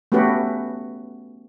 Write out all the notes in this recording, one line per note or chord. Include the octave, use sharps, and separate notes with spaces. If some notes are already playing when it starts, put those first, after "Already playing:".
A3 B3 C#4 F#4 G4 B4